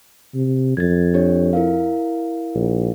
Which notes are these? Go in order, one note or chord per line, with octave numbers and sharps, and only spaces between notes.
C3
F2 G#6 A6
D4 G4 C#5
E4 A#4 F5
A#1